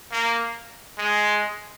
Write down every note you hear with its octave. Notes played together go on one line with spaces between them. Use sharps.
A#3
G#3